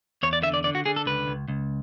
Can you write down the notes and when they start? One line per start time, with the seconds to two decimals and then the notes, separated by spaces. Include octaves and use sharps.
0.23 E2 C#5
0.33 D5
0.43 D3 E5
0.54 D5
0.64 D3 D5
0.75 F#4
0.86 D3 G#4
0.96 A4
1.06 C#2 B4
1.28 C#2
1.48 C#2